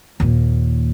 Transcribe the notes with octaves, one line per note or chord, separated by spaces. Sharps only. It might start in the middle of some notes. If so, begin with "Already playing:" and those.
D#2 A#2